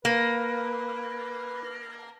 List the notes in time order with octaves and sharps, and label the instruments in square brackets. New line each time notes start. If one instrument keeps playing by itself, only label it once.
[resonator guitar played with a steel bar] A#3 [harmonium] B4